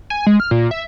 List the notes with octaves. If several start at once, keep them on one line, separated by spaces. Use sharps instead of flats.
G#5
G#3
F6
A#2
E5